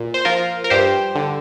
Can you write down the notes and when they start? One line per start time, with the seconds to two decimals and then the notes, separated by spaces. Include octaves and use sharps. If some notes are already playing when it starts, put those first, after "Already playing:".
Already playing: A#2
0.14 C5
0.25 F3 F4 A#4
0.64 A#4
0.70 G2 G4 C5
1.15 D3